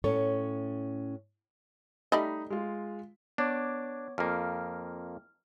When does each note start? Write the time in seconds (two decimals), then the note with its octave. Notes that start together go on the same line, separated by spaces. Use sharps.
0.04 A2 C#4 A4 C#5
2.12 G3 A3 D#4 D#5 B5
2.50 G#3 F4
3.38 B3 D4 C#5 D6
4.18 F2 A#3 F6